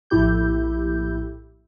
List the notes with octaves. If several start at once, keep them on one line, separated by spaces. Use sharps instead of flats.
A#1 A2 E4 G4 G6